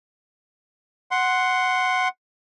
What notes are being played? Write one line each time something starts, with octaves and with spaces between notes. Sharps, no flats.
F#5 C6